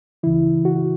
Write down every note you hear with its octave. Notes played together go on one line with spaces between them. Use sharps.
C#2 C#3 E3 E4
F#4